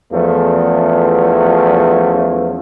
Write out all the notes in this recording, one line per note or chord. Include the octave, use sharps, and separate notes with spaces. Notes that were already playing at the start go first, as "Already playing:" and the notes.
E2 F3 A3 C#4